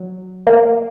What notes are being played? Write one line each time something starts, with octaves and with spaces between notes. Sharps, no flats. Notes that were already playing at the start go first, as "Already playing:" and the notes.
Already playing: F#3
A#3